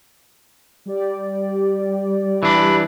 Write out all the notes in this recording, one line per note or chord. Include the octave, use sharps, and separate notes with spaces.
G3 G4 D5
E3 D4 B5